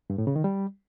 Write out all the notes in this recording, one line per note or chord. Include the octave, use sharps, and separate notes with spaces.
G2
A2
C#3
D#3
G3